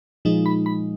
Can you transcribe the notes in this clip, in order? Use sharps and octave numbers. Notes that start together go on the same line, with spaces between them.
A#2 F3 G#3 D#4
B5
B5